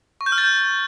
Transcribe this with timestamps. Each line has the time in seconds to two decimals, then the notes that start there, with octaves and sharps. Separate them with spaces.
0.21 C#6
0.26 G6
0.32 F6
0.38 A6
0.44 G6